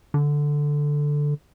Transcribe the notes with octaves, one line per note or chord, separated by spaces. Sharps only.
D3